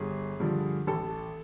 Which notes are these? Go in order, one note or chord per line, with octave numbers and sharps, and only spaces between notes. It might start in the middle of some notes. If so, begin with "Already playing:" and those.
Already playing: G1 G#4
G2 D3 F3
A1 A4